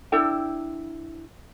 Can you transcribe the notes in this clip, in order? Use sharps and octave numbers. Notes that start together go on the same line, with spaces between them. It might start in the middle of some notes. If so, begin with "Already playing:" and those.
D4 E4 A4 G5